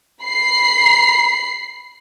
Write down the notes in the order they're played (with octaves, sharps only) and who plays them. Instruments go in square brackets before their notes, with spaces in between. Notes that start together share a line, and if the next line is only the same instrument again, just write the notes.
[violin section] B5 C7